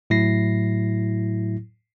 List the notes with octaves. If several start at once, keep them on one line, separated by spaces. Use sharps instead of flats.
A2 F#3 E4 A#6 C7